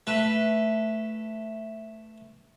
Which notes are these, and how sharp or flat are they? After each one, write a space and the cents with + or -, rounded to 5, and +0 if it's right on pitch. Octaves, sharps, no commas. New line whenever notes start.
A3 +0 B4 -10